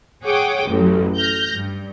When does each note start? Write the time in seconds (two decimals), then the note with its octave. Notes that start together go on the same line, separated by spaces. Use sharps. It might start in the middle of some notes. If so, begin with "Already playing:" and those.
0.23 G#4 C#5 F#5 G5 D6 D#6
0.67 A1 F#2 F#3
1.17 F6 G6 A#6
1.52 G2